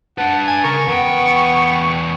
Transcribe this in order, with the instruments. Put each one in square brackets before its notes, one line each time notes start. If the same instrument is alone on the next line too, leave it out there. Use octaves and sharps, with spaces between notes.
[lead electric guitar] D4 B4 [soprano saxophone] F#5 [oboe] A5
[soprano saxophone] G#5
[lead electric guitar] C#3 [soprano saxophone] A#4 [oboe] C#6
[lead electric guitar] E2 G5 [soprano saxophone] B3